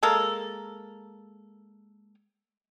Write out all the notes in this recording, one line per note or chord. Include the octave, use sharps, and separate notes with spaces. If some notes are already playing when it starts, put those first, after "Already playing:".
G#3 A#3 A4 A#4